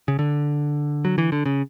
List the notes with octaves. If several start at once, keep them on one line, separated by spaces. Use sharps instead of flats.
C#3
D3
F#3
E3
D3
C#3